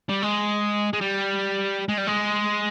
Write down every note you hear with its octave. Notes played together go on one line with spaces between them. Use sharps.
G3
G#3
G#3
G3
G#3
G3
G#3